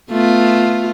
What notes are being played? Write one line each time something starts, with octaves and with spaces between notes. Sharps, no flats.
A3 B3 F4